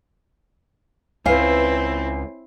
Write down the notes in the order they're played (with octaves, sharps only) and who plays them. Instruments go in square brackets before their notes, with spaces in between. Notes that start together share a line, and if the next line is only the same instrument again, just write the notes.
[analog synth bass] C#2 [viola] C4 E4 [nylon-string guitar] B4 F5 [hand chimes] C#5 G#5 C7